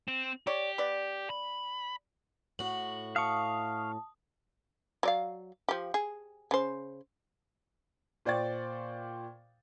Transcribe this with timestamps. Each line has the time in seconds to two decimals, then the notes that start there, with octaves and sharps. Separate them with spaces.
0.08 C4
0.47 G4 C#5 D5
0.78 B3 D5
1.30 B5
2.59 A2 F#4 F#7
3.16 F5 A5 C#6 D#6
5.03 F#3 D5 F5
5.69 F3 G4
5.94 G#4
6.51 C#3 C5
8.25 A#2 C5 D5 G5 C#6 A6